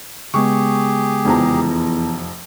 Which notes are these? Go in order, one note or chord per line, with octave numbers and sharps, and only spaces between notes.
C#3 G#3 B3 G4 G#4 C#6
F1 E2 F3 A#5